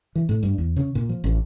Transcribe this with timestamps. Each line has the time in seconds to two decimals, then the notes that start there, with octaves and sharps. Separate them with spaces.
0.15 E3
0.29 A2
0.43 G2
0.58 E2
0.77 C#3
0.95 A#2
1.09 F3
1.24 A1